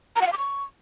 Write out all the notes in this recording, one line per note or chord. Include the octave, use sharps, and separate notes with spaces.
A#5
F#5
F5
D6
C#6